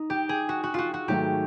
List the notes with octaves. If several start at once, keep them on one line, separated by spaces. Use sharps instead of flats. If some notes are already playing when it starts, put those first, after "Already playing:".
Already playing: D#4
G4
G#4
F#4
F#4
F4 F#4
F#4
G#2 D#3 F#3 A3 G4